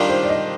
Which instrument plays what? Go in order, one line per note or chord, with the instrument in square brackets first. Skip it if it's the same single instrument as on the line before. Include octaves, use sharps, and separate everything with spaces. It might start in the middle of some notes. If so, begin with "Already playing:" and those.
Already playing: [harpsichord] D#3 G3 D4 F4 [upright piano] A#4
[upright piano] C5
D5
D#5